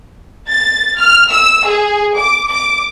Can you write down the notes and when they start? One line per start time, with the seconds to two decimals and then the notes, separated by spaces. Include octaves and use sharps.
0.49 A6
0.97 F6
1.30 E6
1.65 G#4
2.16 D6
2.46 D6